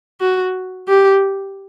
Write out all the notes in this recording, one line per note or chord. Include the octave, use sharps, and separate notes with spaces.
F#4
G4